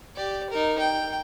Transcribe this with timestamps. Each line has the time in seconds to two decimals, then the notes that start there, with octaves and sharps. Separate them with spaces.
0.16 G4 D5
0.50 D#4 A#4
0.79 G5